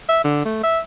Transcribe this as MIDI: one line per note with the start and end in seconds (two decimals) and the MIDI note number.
0.09 0.24 76
0.24 0.40 50
0.45 0.63 57
0.63 0.79 76